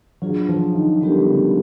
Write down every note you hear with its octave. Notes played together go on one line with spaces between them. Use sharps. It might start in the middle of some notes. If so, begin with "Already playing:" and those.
F#3 D4 F4 G#4
F3
D#3
D3 G3 B3 E4 G4 A#4
C#3